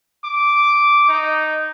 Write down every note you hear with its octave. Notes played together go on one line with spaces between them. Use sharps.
D6
D#4